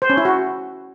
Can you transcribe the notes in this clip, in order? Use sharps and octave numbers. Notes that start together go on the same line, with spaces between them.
C5
C#4
E4
F#4